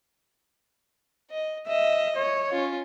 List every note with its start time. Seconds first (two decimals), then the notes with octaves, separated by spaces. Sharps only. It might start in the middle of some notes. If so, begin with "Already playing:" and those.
1.30 D#5
1.68 D#5 E5
2.16 C#5
2.52 C#4 F4